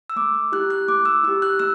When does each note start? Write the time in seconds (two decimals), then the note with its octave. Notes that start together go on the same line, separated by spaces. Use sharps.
0.10 E6
0.16 A3 D6
0.34 E6
0.52 E4 G4 F#6
0.70 F#6
0.88 A3 D6
1.05 E6
1.24 E4 E6
1.28 G4
1.42 F#6
1.59 A3 E6